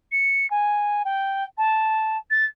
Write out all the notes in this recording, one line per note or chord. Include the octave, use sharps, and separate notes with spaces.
C#7
G#5
G5
A5
A6